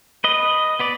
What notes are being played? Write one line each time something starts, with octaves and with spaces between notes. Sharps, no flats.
B4 D#5
B3 B4 D5